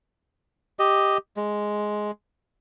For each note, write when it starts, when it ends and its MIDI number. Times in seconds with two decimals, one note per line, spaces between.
0.79 1.18 67
0.79 1.18 75
1.37 2.11 56